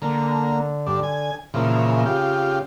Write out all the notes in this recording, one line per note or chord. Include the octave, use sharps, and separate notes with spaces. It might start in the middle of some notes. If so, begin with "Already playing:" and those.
D3 A#3
G2 D4
G#5
A#2 C#3 E3 F3
F4 G4